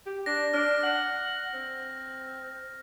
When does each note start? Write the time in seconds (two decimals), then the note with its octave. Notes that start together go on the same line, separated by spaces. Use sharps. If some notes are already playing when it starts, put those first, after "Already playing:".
0.06 G4
0.26 D4 A#6
0.53 D4 F6
0.83 F#5
1.54 C4